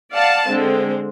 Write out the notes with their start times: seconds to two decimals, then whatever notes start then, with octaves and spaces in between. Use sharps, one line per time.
0.12 D5 F5 F#5 A5
0.48 D3 G#3 C4